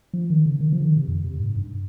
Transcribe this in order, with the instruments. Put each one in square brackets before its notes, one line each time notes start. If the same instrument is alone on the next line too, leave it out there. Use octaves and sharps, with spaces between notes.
[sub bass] F3
D#3
C#3
D#3
F3
C#3
D#3
C3
F2
C3
G#2
G2